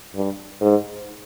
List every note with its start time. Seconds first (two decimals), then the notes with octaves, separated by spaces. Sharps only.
0.15 G2
0.61 G#2